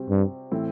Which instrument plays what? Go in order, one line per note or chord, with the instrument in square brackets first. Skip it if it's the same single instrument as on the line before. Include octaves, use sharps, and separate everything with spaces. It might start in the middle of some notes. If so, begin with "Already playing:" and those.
Already playing: [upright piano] C3 G3 C4 F#4
[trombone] G2
[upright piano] A2 E3 A3 C4 E4